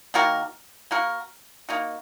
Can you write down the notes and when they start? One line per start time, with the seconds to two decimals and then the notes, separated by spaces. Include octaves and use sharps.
0.14 D#3 A#3 F#4 A#4
0.91 A#3 F#4 A#4
1.69 A#3 D#4 F#4